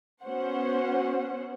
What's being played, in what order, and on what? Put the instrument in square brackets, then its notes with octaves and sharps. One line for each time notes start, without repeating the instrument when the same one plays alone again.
[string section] B3 C#4 F#4 C5 F#5